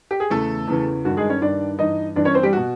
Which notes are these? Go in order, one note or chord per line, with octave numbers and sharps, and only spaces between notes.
G4
G#4
E2 C#3 E3 A3 A4
E2 C#3 E3
G2 D#3 F#4
G#3 G#4
C#4 C#5
G2 D#3 D4 D5
G2 E3 D#4 D#5
G2 E3 D4 D5
C#4 C#5
C4 C5
G3 G4
B2 F#4